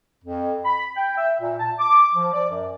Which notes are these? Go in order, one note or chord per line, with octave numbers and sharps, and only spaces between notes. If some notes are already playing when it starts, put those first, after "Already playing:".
F2
B5
G5
E5
A#2
A5
D6
F3
D5
F#2